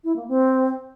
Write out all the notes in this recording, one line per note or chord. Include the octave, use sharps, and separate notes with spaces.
E4
A#3
C4